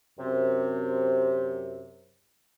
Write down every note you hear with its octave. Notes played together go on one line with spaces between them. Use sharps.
F#2 C3